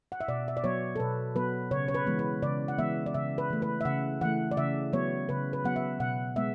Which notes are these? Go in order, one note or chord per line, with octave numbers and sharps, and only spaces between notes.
F#5
E5
B2 D5
E5
D5
F#3 B3 C#5
A4
B2 B4
F#3 B3 B4
C#3 C#5
C#5
B4
E3 G#3 B3
B4
C#3 D5
F#5
E3 G#3 B3 E5
D5
C#3 E5
B4
E3 A3
B4
E5
C#3 F#5
E3 A3 F#5
D5
C#3 E5
F#3 B3 C#5
C#3 B4
B4
F#3 B3 F#5
E5
B2 F#5
G#3 B3 E5